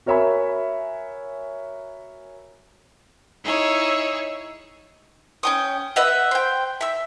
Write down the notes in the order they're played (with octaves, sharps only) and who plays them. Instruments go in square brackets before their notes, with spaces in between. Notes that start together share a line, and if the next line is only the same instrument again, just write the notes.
[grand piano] F#4 A#4 C#5 E5 G#5 B5
[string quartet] D#4 E4 G#4 C#5
[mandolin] C#4 G5 D#6
B4 D#5 E5 F#5
C5 G5
E5 E6